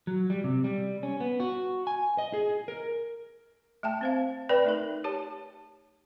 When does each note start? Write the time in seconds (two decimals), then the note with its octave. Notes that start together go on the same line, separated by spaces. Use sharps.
0.07 F#3
0.30 G3
0.44 C3
0.64 G3
1.03 C#4
1.20 B3
1.40 F#4
1.87 G#5
2.18 D#5
2.33 G#4
2.68 A#4
3.83 A3 G5 A5
4.01 C4 C5 F5
4.49 B4 D5 G5 B5
4.64 A3 D#4 A#4
5.04 G4 C#5 A5